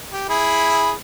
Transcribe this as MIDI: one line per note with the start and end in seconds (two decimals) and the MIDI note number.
0.12 0.25 67
0.29 0.92 64
0.29 0.92 68
0.29 0.92 83